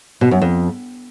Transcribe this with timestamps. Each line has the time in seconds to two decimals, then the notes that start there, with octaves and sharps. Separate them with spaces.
0.21 B2
0.31 F#2
0.42 F2